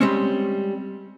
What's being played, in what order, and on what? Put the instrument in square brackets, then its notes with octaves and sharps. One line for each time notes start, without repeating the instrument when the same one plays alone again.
[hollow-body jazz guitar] G3 G#3 C4 C#4